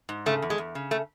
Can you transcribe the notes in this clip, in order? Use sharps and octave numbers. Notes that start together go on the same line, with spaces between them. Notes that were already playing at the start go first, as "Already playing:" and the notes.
G#2
C#3 A3
E2
G#3
E2
C#3
A3